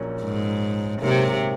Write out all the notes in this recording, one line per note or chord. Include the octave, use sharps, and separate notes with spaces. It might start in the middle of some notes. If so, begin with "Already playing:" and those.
Already playing: A#1 A#2 F#3 A#3 C#4
G#2
G#2 C3 F#3 A#3